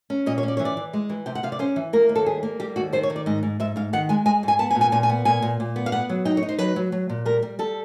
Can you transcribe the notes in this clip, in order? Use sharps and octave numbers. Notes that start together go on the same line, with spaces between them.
C#4
A#2 D#5
C#5
C#4
D5
E3 C#5
D5
E3
G#3
E3
C3 G5
F#5
C3 F5
D5
C#4 C5
E3
A#3 A#4
D#2
A4
G3 G#4
A#3
G3 G4
D#2 F#4
D#3 C5
C#5
D#3
D5
G#2 D#5
G#2
G#2 E5
G#2 F5
D#3 F#5
G#3 G#5
G#3 G#5
G#2 G#5
B3 A5
G#5
A#2
G#5
A#2 G#5
G#5
B3
A#2 G#5
A#2
A#2
B3
F5
B3 F#5
F#3
D#4 G5
C#5
D#4
C5
F#3 B4
F#3
F#3
A#2
G3 A#4
G3
G3 A4